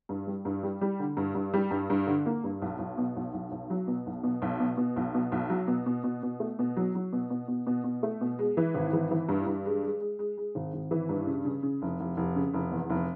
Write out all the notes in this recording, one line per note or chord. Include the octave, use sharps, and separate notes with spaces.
G2
G3
G2
G3
G3
D3
G2
G2
G3
G2
G2
D3
A#3
G2
B1
B1
B2
B1
B1
B1
F#3
B2
B1
B2
B1
B2
B2
B1
B2
B1
F#3
B2
B2
B2
B2
A3
B2
F#3
F#3
B2
B2
B2
B2
B2
A3
B2
G#3
E3
G#1
E3
E3
G2
G2
G#3
G#3
G#3
G#3
G#3
G#1
G#1
E3
G2
C#3
C#3
C#3
F1
F1
F1
C#3
F1
E2
F1